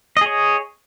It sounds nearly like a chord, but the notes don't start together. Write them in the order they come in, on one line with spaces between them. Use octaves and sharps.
D#5 G#4 C#5